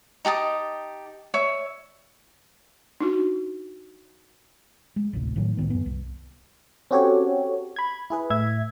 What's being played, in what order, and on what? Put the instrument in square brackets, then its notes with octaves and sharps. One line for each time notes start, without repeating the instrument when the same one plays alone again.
[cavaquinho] D#4 G4 A5 D#6
C#5 E5
[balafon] D4 D#4 F#4
[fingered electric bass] G#3
A1 D2 C3
A2 D#3 F#3
C2 A2 D#3 B3
F#2 B3
C2
[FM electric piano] C4 C#4 F#4 G4 A4 C#5
B5 G#6
E4 G#4 B4
A2 E5 G#6